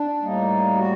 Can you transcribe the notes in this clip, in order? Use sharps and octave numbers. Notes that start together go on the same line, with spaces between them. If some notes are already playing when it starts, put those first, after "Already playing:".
Already playing: D4
A2 G3 A#3 D#4
F#4